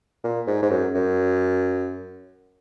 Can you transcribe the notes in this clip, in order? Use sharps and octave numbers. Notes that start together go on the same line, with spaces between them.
A#2
G#2
G#2
F#2
F#2